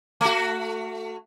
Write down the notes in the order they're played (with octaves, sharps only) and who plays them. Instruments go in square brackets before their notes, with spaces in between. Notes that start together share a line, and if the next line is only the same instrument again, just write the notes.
[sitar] A3 F#4